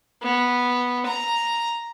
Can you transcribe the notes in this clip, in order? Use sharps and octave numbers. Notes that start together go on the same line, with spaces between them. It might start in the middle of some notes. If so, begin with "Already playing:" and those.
B3
A#5